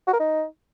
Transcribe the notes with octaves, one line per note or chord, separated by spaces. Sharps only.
F#4
A#4
D#4